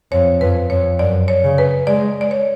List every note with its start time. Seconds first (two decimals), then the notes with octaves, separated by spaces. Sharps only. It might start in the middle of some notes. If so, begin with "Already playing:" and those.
0.12 F2 C#5
0.41 F2 B4
0.70 F2 C#5
0.99 F#2 D5
1.28 C#5
1.43 C#3
1.58 B4
1.87 G#3 D5
2.21 D5
2.31 C#5